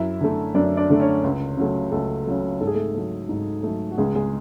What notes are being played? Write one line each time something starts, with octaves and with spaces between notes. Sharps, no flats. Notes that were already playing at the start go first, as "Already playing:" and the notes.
Already playing: F#2 E4 E5
D3 A3
F#2 D4 D5
D4 D5
D3 A3
C#4 C#5
C#2
C#3 F#3 A3
C#2 A3 A4
C#3 F#3 A3
G#2 A4
G#4
A3 A4
F#3 A3
G#2
F#3 A3
F#4
C#2 G#3 G#4
G#3 G#4